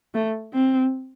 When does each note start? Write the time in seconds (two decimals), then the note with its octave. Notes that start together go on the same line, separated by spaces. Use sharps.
0.14 A3
0.54 C4